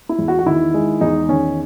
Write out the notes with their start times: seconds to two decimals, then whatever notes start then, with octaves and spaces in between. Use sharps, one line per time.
0.09 E4
0.19 E2
0.28 F#4
0.39 F#4
0.46 D#3 E4
0.74 G#3
1.01 E2 D#4
1.28 D#3 C#4